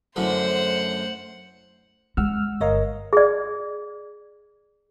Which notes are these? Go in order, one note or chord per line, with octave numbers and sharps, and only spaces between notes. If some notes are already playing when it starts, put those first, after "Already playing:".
F#2 A2 D3 C5 F#5
G#3 F#5 E6 F6
G1 A#4 C#5 D#5 F5
G#4 D5